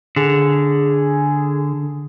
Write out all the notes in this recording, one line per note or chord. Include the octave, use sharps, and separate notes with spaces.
D3 G#4